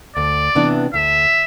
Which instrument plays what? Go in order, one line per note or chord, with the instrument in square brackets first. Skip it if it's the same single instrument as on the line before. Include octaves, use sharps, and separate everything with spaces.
[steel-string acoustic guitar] D2 [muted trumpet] D5
[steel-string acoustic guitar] C3 E3 B3 D4
[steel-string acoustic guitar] D2 [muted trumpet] E5